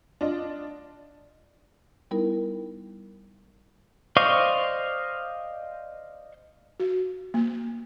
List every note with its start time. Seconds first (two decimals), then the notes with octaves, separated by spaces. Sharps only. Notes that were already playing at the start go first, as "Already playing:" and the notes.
0.21 D4 F4 D#5
2.11 G3 B3 D#4 E4 A#4
4.17 C5 D5 D#5 F5 C#6
6.80 F#4
7.34 A#3